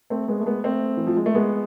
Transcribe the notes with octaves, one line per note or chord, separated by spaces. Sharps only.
A3 C4
G#3 B3
A3
G#3 B3
A3 C4
E3
F3
G#3
A3
G#3 B3